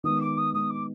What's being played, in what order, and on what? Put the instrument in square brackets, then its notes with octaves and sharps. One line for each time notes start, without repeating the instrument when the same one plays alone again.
[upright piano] D#3 G#3 B3 [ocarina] D#6
[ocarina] D6
D#6
[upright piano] D#3 G#3 B3 [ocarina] D#6
[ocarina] D6